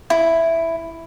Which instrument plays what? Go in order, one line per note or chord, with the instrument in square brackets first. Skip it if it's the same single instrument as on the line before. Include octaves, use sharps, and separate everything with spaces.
[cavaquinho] E4